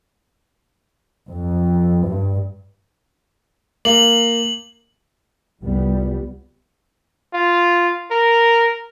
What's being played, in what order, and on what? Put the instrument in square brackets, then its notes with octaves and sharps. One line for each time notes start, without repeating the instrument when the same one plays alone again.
[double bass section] F2
G2
[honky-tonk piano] A#3 [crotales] F#7
[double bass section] C2 F2 G3 B3
[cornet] F4
A#4